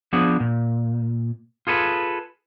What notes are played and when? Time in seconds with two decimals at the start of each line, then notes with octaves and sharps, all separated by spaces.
0.13 F3 B3 C4 D4 G#4
0.40 A#2
1.67 F4 G#4 A4 B4